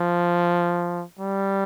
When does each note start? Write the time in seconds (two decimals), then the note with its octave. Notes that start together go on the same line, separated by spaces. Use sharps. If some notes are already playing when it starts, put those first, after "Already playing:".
Already playing: F3
1.19 G3